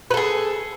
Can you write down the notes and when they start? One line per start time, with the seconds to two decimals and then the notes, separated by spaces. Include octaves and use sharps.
0.11 B4
0.14 A4
0.17 G#4